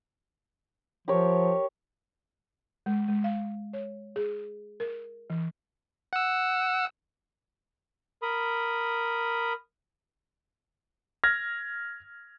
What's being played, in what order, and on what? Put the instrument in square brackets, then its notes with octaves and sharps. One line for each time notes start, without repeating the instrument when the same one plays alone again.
[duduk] F3 [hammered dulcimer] G4 A#4 C#5
[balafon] G#3
G#3
F5
C#5
G#4
A#4
E3
[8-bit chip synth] F#5 E6
[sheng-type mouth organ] A#4 B5 D#6
[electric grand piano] F6 G#6 A#6